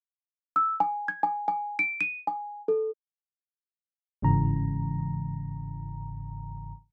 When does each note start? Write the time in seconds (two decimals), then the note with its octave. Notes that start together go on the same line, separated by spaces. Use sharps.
0.56 E6
0.80 G#5
1.08 G#6
1.23 G#5
1.48 G#5
1.79 D7
2.01 D#7
2.27 G#5
2.68 A4
4.22 G1 G#2 C#3 E3 A#5